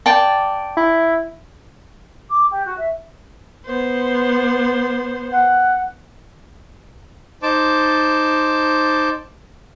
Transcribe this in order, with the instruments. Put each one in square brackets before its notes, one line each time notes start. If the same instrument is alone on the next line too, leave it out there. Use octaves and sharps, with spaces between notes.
[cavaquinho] D5 G5 A5
[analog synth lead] E4
[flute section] D6
G4
F#4
E5
[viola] B3 C5
[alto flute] F#5
[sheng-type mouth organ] D#4 C5 A5 D6